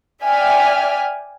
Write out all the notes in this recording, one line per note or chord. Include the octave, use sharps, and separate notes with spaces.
D5 E5 G5 G#5 F6 B6